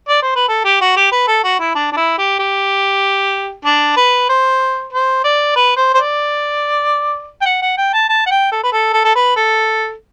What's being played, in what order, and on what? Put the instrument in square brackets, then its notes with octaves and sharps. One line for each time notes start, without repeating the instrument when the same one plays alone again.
[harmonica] D5
C5
B4
A4
G4
F#4
G4
B4
A4
F#4
E4
D4
D4
E4
G4
G4
D4
B4
C5
C5
D5
B4
C5
C5
D5
G5
F#5
F#5
G5
A5
A5
F#5
G5
A4
B4
A4
A4
A4
B4
A4